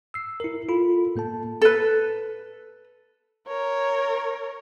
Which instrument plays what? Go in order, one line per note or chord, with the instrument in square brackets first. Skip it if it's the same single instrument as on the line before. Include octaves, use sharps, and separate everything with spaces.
[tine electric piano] E6 C7
E4 A#4
F4 A4 B5
A2 A#3 A4 A5
[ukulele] A4 B4
[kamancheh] A#4 C#5